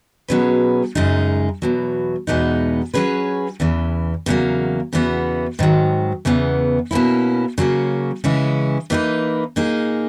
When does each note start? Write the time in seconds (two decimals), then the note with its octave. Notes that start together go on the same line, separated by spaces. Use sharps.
0.28 B2 F#3 C#4 G#4 B4
0.95 F#2 C#3 G#3 D#4 G#4
1.62 E2 B2 F#3
2.27 E2 B2 G#3 B3 D#4
2.94 F#3 C#4 G#4 B4
3.60 E2 C#3 E3
4.26 E2 C#3 F#3 A#3
4.93 E2 C#3 E3 B3 F#4
5.59 G#2 D#3 F#3
6.25 E2 C#3 E3 B3
6.91 B2 A#3 C#4 E4
7.58 C#3 F#3 A#3 C#4
8.24 C#3 E3 G#3 C#4 E4
8.90 E3 A#3 D#4 G#4 B4
9.56 A#2 A#3 D#4 G#4